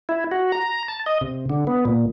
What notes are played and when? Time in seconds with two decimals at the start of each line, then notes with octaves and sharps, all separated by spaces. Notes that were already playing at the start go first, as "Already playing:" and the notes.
0.09 E4
0.32 F#4
0.52 A#5
0.88 A5
1.06 D#5
1.21 C3
1.50 D3
1.67 B3
1.85 A#2